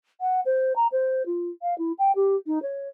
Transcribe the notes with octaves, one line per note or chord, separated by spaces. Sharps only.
F#5
C5
A#5
C5
F4
F5
E4
G5
G4
D#4
C#5